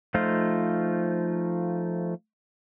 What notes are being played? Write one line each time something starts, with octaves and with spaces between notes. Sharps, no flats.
F3 A3 D#4 F4 C5